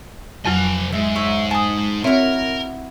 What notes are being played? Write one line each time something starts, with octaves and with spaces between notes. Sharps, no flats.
F2 F3 F#3 F4 G#5
G#2 E5
C#5 E5
G#5 A5 D#6
C4 E4 F#4 A#4 C#5